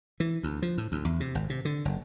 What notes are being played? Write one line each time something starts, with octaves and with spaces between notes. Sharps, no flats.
E3
D2
F3
A2
D2
E2
C3
G#1
C3
D3
F#1